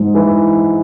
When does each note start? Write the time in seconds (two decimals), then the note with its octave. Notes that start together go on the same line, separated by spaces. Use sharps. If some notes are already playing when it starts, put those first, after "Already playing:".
Already playing: G#2
0.15 E3